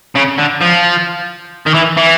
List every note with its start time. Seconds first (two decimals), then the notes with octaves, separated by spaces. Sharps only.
0.15 C#3
0.38 D3
0.61 F3
1.66 D#3
1.74 E3
1.97 E3